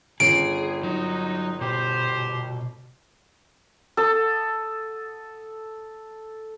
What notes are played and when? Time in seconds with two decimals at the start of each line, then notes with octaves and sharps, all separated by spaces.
0.20 G1 C#4 G#4 C7 D7
0.83 F#3 D#4
1.61 B2 G4 C5
3.97 A4 D#6